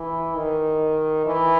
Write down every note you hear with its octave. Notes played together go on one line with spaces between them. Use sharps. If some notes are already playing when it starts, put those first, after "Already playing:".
Already playing: E3
D#3
E3